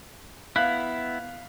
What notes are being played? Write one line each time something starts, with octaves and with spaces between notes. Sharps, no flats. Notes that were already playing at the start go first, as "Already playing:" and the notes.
B3 E4 F5 F#6